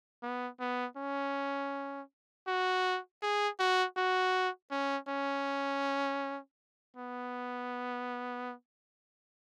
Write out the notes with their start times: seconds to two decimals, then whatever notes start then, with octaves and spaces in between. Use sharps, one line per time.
0.23 B3
0.60 B3
0.97 C#4
2.47 F#4
3.22 G#4
3.59 F#4
3.97 F#4
4.71 C#4
5.09 C#4
6.97 B3